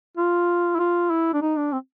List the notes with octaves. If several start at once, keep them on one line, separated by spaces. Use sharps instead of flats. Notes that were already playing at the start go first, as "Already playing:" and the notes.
F4
E4
F4
E4
D4
D#4
D4
C4